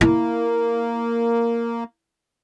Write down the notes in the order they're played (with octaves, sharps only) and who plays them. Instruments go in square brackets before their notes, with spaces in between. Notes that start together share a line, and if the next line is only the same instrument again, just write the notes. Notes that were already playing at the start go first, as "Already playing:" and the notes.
[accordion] A#3 [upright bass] E4